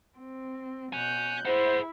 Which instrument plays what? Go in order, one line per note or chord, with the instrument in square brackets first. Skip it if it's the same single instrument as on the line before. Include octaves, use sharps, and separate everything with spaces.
[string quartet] C4
[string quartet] B2 F#6 G6 [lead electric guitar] C#5 G#5
[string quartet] E4 [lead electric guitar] G#4 F#5 [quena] C5